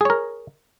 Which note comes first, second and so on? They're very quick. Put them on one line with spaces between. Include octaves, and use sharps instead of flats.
G#4 C#5 A#4